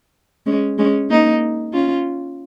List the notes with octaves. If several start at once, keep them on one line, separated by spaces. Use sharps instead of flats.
G#3 C#4
G#3 C#4
A#3 D#4
C#4 F4